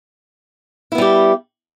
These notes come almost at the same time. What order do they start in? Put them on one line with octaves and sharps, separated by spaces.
E4 B3 G3 G4